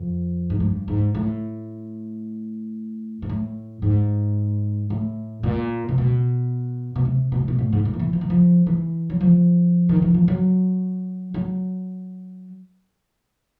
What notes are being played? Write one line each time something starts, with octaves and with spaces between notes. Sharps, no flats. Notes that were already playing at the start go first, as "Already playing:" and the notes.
Already playing: F2
G#2
G2
G#2
A2
G#2
A2
G#2
A2
A#2
C3
B2
B2
C3
B2
C3
B2
A2
G#2
A#2
F3
E3
F3
E3
F3
E3
F#3
F3
D#3
E3
F3
F#3
F#3